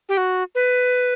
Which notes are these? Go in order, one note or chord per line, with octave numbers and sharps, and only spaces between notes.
G4
F#4
B4